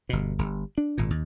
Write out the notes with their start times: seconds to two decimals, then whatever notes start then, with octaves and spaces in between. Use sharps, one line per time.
0.09 G1 B2
0.39 G1
0.78 D4
0.98 G#1 A#2
1.10 D#2